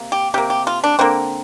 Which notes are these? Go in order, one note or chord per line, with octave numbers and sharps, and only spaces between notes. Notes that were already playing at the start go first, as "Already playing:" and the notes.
Already playing: C3 A#3
G4
C3 A#3 G4
G4
F4
D4
D3 A#3 C4